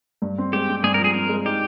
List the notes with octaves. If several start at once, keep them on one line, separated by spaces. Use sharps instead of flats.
G2
C4
G#3 G4
C4
G2 G#4
F3 A#4
G#4
C4 A#4
G#3
D#4 G4